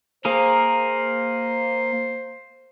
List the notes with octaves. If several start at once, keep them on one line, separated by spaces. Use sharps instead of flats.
A#3 G#4 A#4 C5